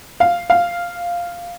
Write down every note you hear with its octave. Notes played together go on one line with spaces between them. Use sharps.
F5
F5